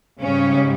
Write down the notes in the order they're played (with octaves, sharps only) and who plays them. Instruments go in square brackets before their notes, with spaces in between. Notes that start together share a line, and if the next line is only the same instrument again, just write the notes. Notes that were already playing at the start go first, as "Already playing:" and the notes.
[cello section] G#2 C#3 G3 C#4